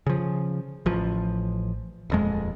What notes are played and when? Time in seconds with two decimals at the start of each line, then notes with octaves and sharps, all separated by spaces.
0.06 C#3 F3
0.86 A1 F3
2.10 D#1 F2 G#3